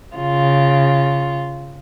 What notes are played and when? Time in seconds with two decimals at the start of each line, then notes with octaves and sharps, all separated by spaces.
0.15 C#3 F4